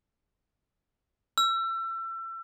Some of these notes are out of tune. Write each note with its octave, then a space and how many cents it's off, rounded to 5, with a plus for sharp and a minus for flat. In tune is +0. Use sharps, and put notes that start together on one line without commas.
E6 +30